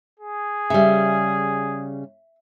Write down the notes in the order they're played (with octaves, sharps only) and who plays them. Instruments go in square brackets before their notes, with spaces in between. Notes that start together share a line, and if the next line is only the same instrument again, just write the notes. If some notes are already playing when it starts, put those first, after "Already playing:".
[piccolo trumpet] G#4
[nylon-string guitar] C#3 G3 [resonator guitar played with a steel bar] E5